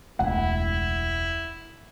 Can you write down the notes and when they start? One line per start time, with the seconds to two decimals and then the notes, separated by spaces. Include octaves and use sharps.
0.19 E1 C#2 A3 E4 F#5